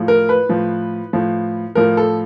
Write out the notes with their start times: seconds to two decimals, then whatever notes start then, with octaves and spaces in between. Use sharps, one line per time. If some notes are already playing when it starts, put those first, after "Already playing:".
Already playing: A2 F3
0.08 A#4
0.29 B4
0.49 A2 F3
1.13 A2 F3
1.75 A2 F3 A#4
1.97 A4